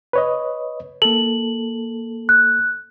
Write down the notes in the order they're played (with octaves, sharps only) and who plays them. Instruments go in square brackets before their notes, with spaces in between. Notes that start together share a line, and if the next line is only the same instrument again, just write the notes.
[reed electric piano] B4 C#5 D#5
[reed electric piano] A#3 A4 [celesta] F#7
[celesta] F#6